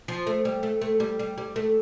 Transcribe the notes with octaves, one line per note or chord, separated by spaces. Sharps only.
F3
A3
G3
A3
A3
G3
G3
G3
A3